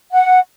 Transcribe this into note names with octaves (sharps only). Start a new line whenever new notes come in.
F#5